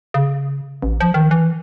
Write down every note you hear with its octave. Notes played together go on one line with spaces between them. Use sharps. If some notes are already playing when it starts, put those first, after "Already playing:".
C#3
A1
F3
D#3
E3